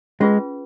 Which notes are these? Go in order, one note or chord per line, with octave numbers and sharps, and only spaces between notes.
G#3 C#4 F4 G#4 B4